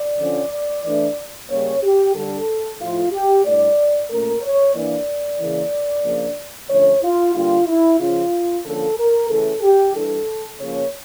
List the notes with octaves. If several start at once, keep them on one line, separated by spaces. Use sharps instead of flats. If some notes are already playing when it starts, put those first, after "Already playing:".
Already playing: D5
D3 F3 C#4
E3 A3 D4
C#3 G3 A#3 C#4 C#5
G4
D3 G3 D4 A4
A2 F3 A3 F4
G4
A2 G3 D4 D5
A#2 A3 C#4 A#4
C#5
E3 A#3 D4 D5
C#3 E3 A#3
C#3 F3 A#3 D4
D3 F3 A3 C#4 C#5
F4
D3 G3 A#3 D4 F4
E4
C#3 F3 C#4 F4
D3 F3 A#3 C#4 A4
A#4
C#3 E3 A3 C#4 A4
G4
E3 G3 D4 A4
C#3 F3 A#3 C#4 C#5